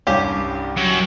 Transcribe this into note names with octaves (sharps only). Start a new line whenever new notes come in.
C2 G2 C#4 G4 F5
F#2